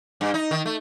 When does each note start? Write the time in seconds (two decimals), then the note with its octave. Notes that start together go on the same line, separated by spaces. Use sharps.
0.21 G2
0.34 D#4
0.51 D#3
0.66 A3